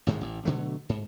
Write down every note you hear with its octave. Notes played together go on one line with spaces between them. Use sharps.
A1 G#2 D#3 G#3
A1
B2 D3 F#3 A3
G#2